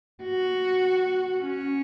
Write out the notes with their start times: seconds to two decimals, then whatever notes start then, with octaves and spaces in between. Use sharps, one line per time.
0.23 F#4
1.42 C#4